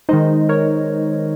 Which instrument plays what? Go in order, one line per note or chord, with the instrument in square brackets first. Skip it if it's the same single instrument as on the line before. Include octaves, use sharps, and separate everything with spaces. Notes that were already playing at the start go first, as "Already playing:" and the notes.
[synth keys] D#3 G#3 D#4 C5 D#5
A#4 C#5